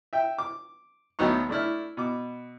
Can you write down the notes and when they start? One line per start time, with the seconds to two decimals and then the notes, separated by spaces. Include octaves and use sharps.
0.13 E5 G5
0.38 D6
1.19 D2 F#3 B3 D#4 C#6
1.49 A3 D4 E4 F6
1.97 B2 D6